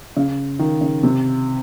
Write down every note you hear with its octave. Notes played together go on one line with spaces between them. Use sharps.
C#3
D#3
C#3
C3